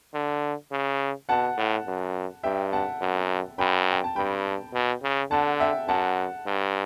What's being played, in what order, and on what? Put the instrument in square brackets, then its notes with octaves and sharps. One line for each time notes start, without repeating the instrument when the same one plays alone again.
[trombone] D3
C#3
[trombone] B2 [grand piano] F#5 A5
[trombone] A2
F#2
[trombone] G2 [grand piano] E5 G5
[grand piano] F#5 A5
[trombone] F#2
[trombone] F#2 [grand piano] G5 B5
[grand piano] G5
A5
[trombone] G2 [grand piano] G5 B5
[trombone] B2
C#3
[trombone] D3 [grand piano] F#5 A5
[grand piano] E5 G5
[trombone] F#2 [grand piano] F#5 A5
[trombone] G2